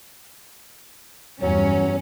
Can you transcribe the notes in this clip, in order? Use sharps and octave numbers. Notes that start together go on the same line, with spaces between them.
E2 G2 F#3 C#4